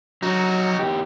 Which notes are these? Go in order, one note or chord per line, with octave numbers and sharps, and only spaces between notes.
F#3 D#4 F#4
E2 G4